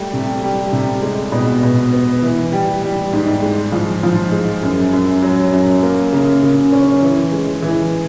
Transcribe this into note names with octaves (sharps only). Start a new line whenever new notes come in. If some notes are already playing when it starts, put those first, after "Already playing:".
Already playing: G3 A3
C3
G3
C3
G#3
B2
B2
B3
E3
G3
G3
G#2
G#3
F3
F3
G#3
F#2
F#2
F#3
F#2
A#3
C#3
C#3
C#4
E3
G#3
E3